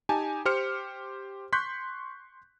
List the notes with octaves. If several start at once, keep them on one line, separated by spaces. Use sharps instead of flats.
D#4 G4 G#5 A5
G4 C5 F6 C#7
C6 C#6 F#6 G6 B6